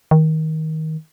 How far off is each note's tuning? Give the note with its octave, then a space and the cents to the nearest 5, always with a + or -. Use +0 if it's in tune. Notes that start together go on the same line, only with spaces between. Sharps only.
D#3 +20